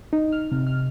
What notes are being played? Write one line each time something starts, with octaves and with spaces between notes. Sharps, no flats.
D#4
F6
C3
F6